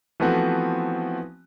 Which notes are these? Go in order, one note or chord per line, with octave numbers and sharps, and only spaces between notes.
E3 F3 A3 B3 C4 F#4